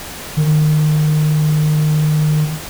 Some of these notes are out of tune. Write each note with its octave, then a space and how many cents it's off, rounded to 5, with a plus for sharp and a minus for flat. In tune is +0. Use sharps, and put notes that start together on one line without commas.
D#3 -30